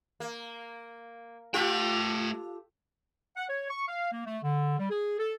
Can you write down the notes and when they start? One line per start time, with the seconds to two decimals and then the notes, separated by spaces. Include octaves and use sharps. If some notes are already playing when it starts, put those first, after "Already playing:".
0.20 A#3
1.54 A3 F4 G4 A4 G5
3.37 F#5
3.49 C#5
3.70 C#6
3.88 F5
4.12 A#3
4.26 A3
4.43 D3
4.78 G3
4.90 G#4
5.19 A4